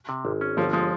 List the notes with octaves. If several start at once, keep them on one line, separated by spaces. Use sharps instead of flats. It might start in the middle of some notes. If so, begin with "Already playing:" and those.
C3
G#1
C#4
G1 F3
F3 G#3